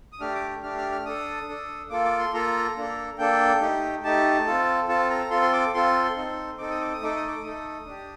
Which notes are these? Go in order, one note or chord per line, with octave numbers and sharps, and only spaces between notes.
D#6
A3 D4 G4 F6
D6
A3 D4 G4 F6
F6
F6
D4 A4 D#6
D4 A4
A#3 F4 A4 D6
D6
C6
A#3 F4 A4 A#5
A#3 D4 A4
A#3 D4 A4 G5
A3 D#4 G4
A3 D#4 G4 A5
C4 F4 A4
C4 F4 A4 A5
A#5
C4 F4 A4 C6
C6
D6
C4 F4 A4 C6
C4 D#4 A4
C4 D#4 A4 D6
D#6
D6
D#6
A3 D#4 A4 D6
D#6
D6
A3 D#4 A4 D#6
D4 G4